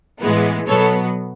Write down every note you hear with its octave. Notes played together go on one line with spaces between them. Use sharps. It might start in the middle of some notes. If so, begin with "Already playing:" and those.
A2 E3 G#3 B3
B2 F#3 B3 A4 C#5